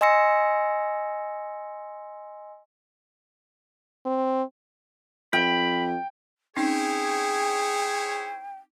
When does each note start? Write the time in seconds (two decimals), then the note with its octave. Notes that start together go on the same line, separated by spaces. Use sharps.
0.01 D#5 G#5 C6 E6 A#6 C#7
4.05 C4
5.33 F2 G5 B5
6.56 C4 C#4 D#4 E4 G#4 C5 C#5 G5